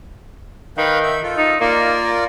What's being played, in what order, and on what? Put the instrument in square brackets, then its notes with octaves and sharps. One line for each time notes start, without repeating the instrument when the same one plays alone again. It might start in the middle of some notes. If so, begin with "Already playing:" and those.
[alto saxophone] D#3 [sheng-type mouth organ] B4 F5 G5
[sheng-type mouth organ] E5
F4 A4
[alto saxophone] D#4
[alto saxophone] A#3 [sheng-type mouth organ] F4 A#4 D5